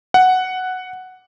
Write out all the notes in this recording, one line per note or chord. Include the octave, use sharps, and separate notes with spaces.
F#5